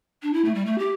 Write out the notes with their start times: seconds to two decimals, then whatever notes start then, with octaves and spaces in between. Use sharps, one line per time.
0.22 D4
0.33 E4
0.44 A3
0.54 G3
0.65 A3
0.78 G4